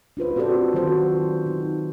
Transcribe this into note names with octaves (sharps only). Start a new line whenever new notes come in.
D4 F4 B4 C5
C4 F#4 G4 A4 C5 D5
D#3 F#3 F4 F#4 C5
D#3 D#4